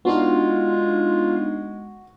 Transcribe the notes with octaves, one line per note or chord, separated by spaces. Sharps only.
G#3 B3 D4 D#4 F4 F#4